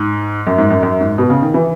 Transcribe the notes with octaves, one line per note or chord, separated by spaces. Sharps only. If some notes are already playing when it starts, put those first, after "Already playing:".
Already playing: G#2
F#2
G#2
F#2
F#2
G#2
B2
C#3
D#3
E3